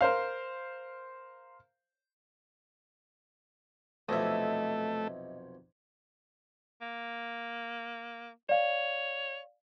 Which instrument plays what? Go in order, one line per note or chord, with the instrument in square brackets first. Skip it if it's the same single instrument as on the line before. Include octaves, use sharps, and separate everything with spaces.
[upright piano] A#4 C5 F5
[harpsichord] B1 F2 C3 [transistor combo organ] A3 [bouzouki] D#5 E5
[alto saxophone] A#3
[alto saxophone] C#5 [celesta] D5 F5